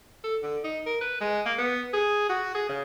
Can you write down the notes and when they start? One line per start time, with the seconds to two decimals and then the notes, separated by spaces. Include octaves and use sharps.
0.24 A4
0.43 D3
0.64 D#4
0.86 A#4
1.01 B4
1.21 G#3
1.46 A#3
1.58 B3
1.93 G#4
2.29 F#4
2.55 G#4
2.69 C#3